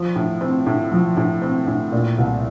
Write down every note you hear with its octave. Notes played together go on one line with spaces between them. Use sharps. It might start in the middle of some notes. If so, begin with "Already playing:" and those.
Already playing: F3
A2
C4
A2
F3
A2
C4
A2
A#2
C2